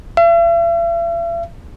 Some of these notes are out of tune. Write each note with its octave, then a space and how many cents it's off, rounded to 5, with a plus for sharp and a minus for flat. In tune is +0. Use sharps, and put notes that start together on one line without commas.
E5 +45